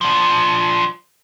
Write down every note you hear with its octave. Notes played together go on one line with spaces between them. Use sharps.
F3 D4